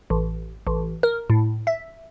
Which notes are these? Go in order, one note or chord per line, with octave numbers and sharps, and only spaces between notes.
A1
A1
A#4
A2
E5